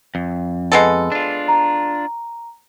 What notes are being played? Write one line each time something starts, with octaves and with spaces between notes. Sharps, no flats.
F2
G#3 B3 A4
D4 F4
A#5